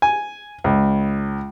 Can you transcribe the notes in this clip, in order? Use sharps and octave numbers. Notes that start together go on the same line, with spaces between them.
G#5
C#2